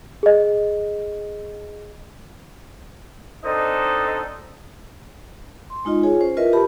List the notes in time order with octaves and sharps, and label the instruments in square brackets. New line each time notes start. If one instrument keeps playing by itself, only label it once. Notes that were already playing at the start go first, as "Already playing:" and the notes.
[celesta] G#4 D#5
[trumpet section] C4 D4 D#4 A4 C5 D#5
[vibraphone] C6
G#3 D#4 F4 D#5
F4 G#4 C#5 G#5
C#4 C5
E4 F4 A#4 B4 D#5 E5
G4 B4 A5 B5